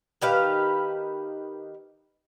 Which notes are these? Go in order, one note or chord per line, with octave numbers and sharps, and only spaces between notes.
D#3 G4 B4 F5